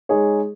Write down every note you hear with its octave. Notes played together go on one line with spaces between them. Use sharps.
G#3 D#4 G#4 C#5